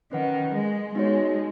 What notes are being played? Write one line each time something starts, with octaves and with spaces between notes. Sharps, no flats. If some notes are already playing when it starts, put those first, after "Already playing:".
D#3 C#4 B4 F#5
G#3
G#3 B3 D#4 F#4 C#5